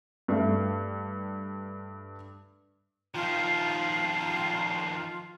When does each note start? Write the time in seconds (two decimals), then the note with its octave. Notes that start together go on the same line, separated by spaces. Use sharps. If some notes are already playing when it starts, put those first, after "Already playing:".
0.28 G2 A3
3.14 D#3 F3 F4